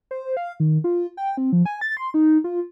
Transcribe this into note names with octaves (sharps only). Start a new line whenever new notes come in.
C5
F5
D#3
F4
G5
C4
F3
G#5
A6
C6
D#4
F4